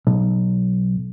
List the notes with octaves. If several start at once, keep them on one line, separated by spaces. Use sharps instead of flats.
B1